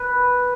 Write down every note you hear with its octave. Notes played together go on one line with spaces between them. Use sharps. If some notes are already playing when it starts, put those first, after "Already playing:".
Already playing: B4